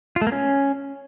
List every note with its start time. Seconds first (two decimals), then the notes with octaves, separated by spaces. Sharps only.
0.16 F4
0.21 A3
0.27 A#3
0.32 C#4